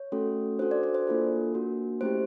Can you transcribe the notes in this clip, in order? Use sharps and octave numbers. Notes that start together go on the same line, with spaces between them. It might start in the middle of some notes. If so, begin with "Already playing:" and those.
Already playing: C#5
A3 C#4 F#4 A4
D4 F#4 A4 C5
D5
D5
C5
A#3 D4 F4 A4
A#3 D4 F#4
A3 C#4 E4 G4 C5